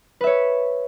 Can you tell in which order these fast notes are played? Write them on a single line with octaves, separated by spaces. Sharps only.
B4 E5 C#5